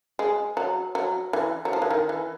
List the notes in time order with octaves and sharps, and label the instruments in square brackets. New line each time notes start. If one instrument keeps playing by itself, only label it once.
[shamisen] G#3
F#3
F#3
E3
F#3
F3
E3
D#3
E3